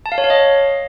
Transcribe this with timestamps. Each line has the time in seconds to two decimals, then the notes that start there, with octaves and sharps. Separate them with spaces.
0.06 A5
0.12 F5
0.18 C#5
0.24 F5
0.30 D#5